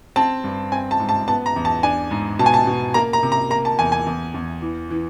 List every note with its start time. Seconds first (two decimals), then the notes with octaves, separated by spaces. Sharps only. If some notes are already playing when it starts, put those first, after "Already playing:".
0.16 C4 A5
0.44 G2
0.72 C4 G#5
0.91 A5
1.00 G#2
1.09 A5
1.28 B3 A5
1.46 A#5
1.56 E2
1.65 A5
1.83 D4 G#5
2.11 G#2
2.39 B2 A5
2.46 G#5
2.54 A5
2.67 B2
2.94 A#3 A#5
3.13 A#5
3.23 C3
3.32 A#5
3.50 A#3 A#5
3.65 A5
3.79 E2 G#5
3.92 G#5
4.06 E2
4.34 E2
4.62 E3
4.90 E3